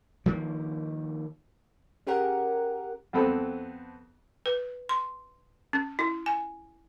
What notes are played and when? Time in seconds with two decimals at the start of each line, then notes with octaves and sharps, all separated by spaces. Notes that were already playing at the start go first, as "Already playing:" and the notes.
0.26 D#3 F3 A#3
2.07 C#4 G4 G#4 A#4 F#5
3.13 F2 B3 C4 A4 B5
4.46 B4
4.89 C6
5.73 C#4
5.99 E4
6.26 G#5